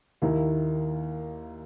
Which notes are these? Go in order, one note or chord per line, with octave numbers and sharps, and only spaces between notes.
D#2 D#3 A#3 E4